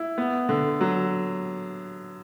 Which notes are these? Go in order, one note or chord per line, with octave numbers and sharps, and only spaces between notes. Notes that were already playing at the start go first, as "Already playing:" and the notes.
Already playing: E4
B3
D3
F#3